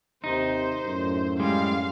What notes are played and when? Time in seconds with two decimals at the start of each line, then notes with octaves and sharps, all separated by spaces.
0.24 D#2 C3 D#4 C5
0.86 F#2 A2
1.40 G3 G#3 F5